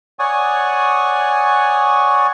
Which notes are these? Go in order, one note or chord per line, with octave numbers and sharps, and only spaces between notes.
C#5 D5 F#5 G#5 C#6 D#6